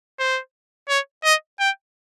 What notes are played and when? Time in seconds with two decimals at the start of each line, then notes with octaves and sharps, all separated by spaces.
0.19 C5
0.89 C#5
1.24 D#5
1.60 G5